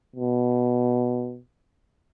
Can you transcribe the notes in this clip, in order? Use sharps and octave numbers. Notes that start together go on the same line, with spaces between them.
B2